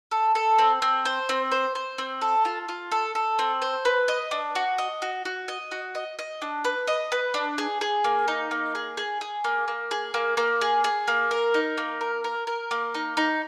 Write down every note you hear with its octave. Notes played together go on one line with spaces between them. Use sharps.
A4
A4
C4
C4
C5
C4
C5
C5
C4
A4
F4
F4
A4
A4
C4
C5
B4
D#5
D4
F#4
D#5
F#4
F#4
D#5
F#4
D#5
D#5
D4
B4
D#5
B4
D4
G#4
G#4
A#3
D#4
A#3
G#4
G#4
G#4
A#3
A#3
G#4
A#3
A#3
G#4
G#4
A#3
A#4
D#4
A#3
A#4
A#4
A#4
A#3
D#4
D#4